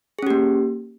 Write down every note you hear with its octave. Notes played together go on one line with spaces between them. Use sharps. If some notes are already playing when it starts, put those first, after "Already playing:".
A#3 C#4 G4 G#4